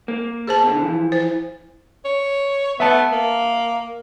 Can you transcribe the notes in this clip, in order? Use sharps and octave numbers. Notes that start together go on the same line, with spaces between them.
A#3
G#4 C5 A5
B2 D3
E3 F3
C5
C#5
B3 E5 A5
A#3